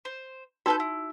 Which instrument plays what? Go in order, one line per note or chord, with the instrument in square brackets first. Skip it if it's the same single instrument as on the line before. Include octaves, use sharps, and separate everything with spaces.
[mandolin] C5
[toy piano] D#4 F#4 [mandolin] A4 B4 G6
[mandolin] E4